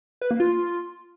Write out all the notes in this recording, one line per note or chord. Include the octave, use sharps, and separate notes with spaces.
B4
A#3
F4